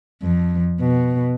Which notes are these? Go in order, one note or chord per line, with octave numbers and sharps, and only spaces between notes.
F2
B2